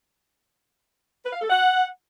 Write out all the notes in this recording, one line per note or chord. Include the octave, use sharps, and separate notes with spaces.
B4
F5
A4
F#5